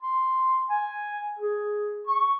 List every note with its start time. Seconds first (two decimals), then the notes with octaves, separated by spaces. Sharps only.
0.03 C6
0.69 G#5
1.39 G#4
2.07 C#6